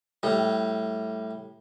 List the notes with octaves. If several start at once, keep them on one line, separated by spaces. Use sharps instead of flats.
A2 G3